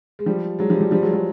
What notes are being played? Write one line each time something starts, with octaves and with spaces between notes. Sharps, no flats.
G#3
F3 G3
F#3 G#3
F3 G3
F3 G3
F3 G3
F#3 G#3
F#3 G#3